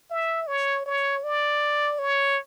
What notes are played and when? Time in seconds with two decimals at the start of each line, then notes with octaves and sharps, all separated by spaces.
0.10 E5
0.47 C#5
0.86 C#5
1.23 D5
1.99 C#5